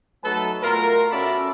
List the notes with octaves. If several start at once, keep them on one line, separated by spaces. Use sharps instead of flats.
F#3 A3 D#4 A4 B4 A5
B2 A3 F4 A#4
C#4 F#4 A4 D5 E5 B5